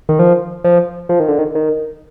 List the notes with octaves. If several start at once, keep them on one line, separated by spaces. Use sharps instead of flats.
D#3
F3
F3
F3
D#3
D3
D#3
D#3